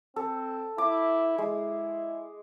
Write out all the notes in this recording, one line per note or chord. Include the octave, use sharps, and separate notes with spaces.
C4 A4
E4 D6
G#3 E4